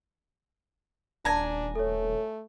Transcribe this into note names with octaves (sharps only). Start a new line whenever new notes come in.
D#1 D4 G#5 A#5
A3 A4 C#5